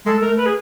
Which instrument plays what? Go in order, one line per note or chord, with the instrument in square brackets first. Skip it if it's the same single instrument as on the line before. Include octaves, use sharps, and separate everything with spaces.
[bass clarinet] G#3 [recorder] A4
[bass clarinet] A3 [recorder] A#4
[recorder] B4
G#4